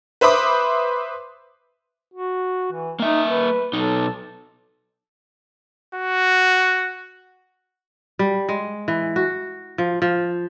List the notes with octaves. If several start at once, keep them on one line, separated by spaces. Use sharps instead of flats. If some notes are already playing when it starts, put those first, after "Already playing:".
B4 C5 E5 B5 D6 D#6
F#4
E3
A#3 D#4 E5
B4
B1 D#4 A4
F#4
G3
G#3
E3
F#4
F3
F3